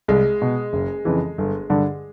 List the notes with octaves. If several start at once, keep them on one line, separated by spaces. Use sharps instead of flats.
C2 G#3
B2
F#1
F2 C#3 E3
G1
G2 D3